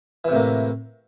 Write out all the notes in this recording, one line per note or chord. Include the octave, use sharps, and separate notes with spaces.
A2 C3 E3 A#3